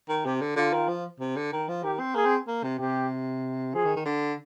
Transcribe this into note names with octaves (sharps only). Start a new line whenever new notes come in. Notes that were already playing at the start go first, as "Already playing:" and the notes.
D#3
C3 G4
D3
D3 F4
D#3
F3
C3
D3
D#3
F3
D#3 G4
C4
A#3 G#4
C4
A#3
C3
C3 G4
F3 G#4
D#3
D#3
D3